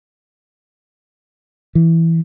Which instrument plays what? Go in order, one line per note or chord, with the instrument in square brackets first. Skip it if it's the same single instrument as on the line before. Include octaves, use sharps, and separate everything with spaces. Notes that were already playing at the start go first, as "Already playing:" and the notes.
[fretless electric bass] E3